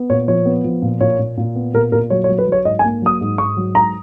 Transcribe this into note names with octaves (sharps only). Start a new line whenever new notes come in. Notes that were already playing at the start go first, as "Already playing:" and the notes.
Already playing: B3
A#2 C#5
F3 C#5
B3
F3
A#2
A#2 C#5
A#2
A#2
B3
A#2 A#4
A#2 A#4
F#3 C#5
C#5
F#3
B4
F#3
C#5
G#2 D#5
G#5
A#3
F#3 D#6
G#2
G#2 C#6
F#3
G#2 A#5